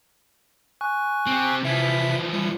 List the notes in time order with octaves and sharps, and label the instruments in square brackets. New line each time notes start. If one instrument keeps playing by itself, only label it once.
[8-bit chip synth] G#5 C#6 F#6
[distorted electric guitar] C4 G4
[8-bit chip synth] C3 E5 B6 [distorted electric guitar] E3 F3
[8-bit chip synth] G3